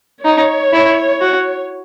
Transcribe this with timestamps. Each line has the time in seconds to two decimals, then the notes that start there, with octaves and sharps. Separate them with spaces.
0.25 D#4 C#5
0.73 E4
1.21 F#4